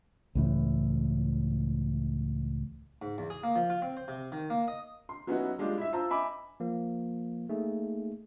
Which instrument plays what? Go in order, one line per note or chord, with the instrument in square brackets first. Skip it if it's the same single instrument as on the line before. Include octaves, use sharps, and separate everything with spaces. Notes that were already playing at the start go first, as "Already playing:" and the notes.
[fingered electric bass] C#2 A2 E3
[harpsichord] G#2
E2
G#4
A#3
F3
F4
C4
C5
C3
D#3
A#3
D#5
[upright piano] C6
F#3 B3 C#4 D#4 E4 F#4
G3 G#3 D4 F4 G4
E4 E5
F4 C5 A5 A#5 E6
D#5 E5 G#5 B5 D6
[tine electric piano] F3 A#3
A3 A#3 D#4 G#4